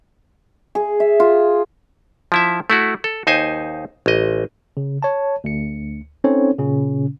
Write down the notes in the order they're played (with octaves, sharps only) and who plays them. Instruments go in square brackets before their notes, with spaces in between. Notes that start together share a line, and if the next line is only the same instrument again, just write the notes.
[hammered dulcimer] G#4
E5
F4
[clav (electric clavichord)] F3 E4 E5
A3 E4 F#4
A4
D#2 D#4 C5 G#5
A1 D#5
[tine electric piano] C#3
C#5 A5
D2 C#7
C4 C#4 D#4 A4 C5 C#5
A#2 C#3 C#4